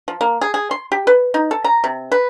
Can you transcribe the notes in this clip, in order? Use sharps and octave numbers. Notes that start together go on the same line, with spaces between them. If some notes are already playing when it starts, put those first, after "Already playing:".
F3
A#3
G#4
G#4
C6
G4
B4
D#4
A4
A#5
C3
B4